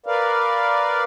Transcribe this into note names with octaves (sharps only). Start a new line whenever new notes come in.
A#4 B4 D5 F5